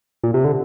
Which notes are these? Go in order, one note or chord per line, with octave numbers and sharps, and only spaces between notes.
A#2
C3
D3